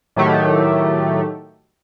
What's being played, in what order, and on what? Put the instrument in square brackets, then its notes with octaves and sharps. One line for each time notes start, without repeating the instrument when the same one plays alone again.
[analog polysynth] A2 D#3 F#3 A3 G4